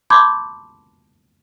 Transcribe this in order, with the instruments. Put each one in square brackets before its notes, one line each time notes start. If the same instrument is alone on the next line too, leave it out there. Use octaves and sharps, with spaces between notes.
[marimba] A5 B5 C6 D6 G6 G#6